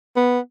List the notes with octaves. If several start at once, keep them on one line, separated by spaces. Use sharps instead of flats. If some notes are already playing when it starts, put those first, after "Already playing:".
B3